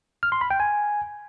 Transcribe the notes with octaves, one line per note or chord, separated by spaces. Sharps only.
F6
C6
B5
G5
G#5